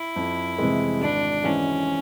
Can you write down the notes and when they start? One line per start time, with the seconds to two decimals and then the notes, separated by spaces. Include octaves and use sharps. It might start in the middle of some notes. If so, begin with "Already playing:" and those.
Already playing: E4
0.16 F2
0.58 C3 E3 G#3
1.01 G#1 D4
1.44 G#2 E3 C#4